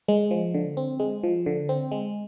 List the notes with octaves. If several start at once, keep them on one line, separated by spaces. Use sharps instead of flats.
G#3
F3
D3
C4
G#3
F3
D3
C4
G#3